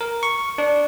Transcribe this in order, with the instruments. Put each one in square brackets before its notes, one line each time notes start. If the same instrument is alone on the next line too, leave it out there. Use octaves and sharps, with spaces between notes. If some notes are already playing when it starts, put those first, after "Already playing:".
[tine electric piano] A#4
C#6
D4